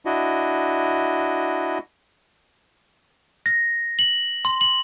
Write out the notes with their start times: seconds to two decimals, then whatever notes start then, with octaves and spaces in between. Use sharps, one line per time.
0.06 D4 E4 F#4 D#5
3.46 A#6
3.99 F#7
4.45 C6
4.61 F#7